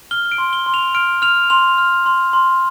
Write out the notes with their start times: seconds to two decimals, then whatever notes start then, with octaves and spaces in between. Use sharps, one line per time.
0.11 F6 G7
0.32 D7
0.38 C6
0.53 G7
0.66 C6
0.74 F7
0.95 F6 D7
1.22 F6 F7
1.50 C6 F7
1.78 F6
2.06 C6
2.33 C6